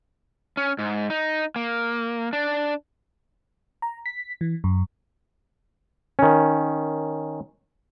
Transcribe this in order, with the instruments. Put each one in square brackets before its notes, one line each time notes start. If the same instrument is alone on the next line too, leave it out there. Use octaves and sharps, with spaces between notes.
[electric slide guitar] C#4
G#2
D#4
A#3
D4
[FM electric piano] A#5
B6
E3
F#2
[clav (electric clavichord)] D#3 C#4